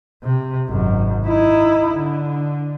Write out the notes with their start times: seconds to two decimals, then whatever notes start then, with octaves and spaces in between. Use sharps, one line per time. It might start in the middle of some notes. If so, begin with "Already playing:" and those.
0.23 C3
0.69 G#1 F#2
1.26 D#4 E4
1.96 D3